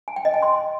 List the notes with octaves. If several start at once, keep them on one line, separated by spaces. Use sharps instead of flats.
G#5
G5
D#5
G#5
C6